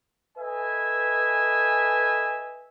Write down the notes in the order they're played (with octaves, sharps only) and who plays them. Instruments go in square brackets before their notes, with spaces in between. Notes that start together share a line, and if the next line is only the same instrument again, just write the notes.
[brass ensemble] A4 B4 D#5 E5 G#5